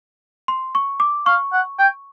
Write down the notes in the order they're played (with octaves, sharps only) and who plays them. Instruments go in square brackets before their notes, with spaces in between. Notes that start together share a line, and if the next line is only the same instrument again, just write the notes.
[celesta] C6
C#6
D6
[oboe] F5 [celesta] C#6
[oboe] F#5
G5